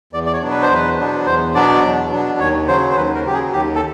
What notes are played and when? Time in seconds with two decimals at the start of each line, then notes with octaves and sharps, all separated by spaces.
0.13 E2 D5
0.26 D5
0.33 C#5
0.42 B2 F#3 B3 D4
0.51 B4
0.62 C5
0.70 E2 B4
0.98 B2 F#3 B3 D4
1.26 E2 C5
1.55 B2 F#3 B3 D4 D5
1.83 E2
2.12 B2 F#3 B3 D4
2.40 D#2 C#5
2.67 C#3 F#3 C5
2.91 C5
2.96 D#2 B4
3.15 A#4
3.24 C#3 F#3 G4
3.34 G#4
3.52 D#2 G4
3.75 A4